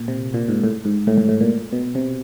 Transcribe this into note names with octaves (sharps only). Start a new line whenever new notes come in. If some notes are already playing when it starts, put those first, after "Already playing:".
Already playing: A#2
C3
A#2
G#2
A2
G#2
A2
A2
A2
A#2
B2
C3